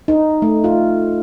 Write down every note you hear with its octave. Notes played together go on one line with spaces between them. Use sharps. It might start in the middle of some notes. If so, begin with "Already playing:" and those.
D#4
A3
F4